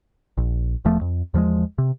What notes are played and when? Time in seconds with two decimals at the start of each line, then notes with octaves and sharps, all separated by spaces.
0.37 A#1
0.85 E1 E2 F3 A3
1.01 F2
1.34 E2 F3 G3 G#3
1.78 C3